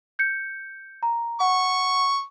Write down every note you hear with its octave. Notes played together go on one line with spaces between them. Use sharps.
G6 C#7
A#5
F#5 C#6